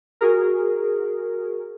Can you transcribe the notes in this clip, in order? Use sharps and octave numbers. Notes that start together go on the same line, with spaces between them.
F#4 G#4 A#4